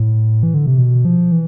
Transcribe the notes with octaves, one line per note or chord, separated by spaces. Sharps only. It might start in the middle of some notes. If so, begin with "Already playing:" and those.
Already playing: A2
E3
D3
C3
B2
F3
E3